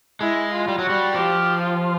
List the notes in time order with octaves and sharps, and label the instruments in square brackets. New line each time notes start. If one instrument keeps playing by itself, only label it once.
[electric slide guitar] G#3 [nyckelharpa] E4
[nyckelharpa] F4
[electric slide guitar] G3
F#3
[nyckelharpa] F#4
[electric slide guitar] G3
[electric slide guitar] F3 [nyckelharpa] G4
[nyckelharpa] F4